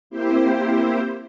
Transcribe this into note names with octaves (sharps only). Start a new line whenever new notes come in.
A#3 C4 E4 G4 C5